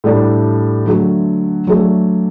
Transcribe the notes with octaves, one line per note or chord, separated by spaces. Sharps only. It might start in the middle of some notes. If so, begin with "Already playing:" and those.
A2 G3 D4 A4
D3 F#3 A3
F#3 A3 D4